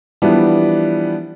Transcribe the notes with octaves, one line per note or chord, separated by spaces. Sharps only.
E3 F3 G3 B3 D4